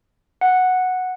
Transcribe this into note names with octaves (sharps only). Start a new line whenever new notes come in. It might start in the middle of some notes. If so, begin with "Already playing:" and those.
F#5